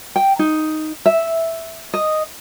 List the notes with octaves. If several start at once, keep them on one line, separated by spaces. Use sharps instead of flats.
G5
D#4
E5
D#5